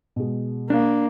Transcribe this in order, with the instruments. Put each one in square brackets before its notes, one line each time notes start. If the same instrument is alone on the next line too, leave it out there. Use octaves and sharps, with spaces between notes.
[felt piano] B2 G#3
[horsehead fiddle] A#3 [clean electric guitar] D4